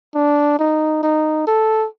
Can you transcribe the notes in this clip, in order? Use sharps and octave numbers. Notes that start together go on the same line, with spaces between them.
D4
D#4
D#4
A4